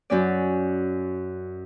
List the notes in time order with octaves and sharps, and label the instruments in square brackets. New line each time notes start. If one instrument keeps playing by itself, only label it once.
[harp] F#2 C#4 D5